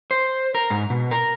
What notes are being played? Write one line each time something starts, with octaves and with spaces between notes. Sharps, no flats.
C5
A#4
G#2
B2
A#4